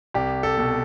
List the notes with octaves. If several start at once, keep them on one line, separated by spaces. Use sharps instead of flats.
C2 G4
A4
B2